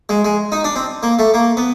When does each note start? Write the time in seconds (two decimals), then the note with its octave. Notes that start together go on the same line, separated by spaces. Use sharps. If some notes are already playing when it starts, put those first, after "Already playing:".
0.09 G#3
0.25 G#3
0.52 D#4
0.64 D4
0.76 C4
1.03 A#3
1.19 A3
1.34 A#3
1.57 B3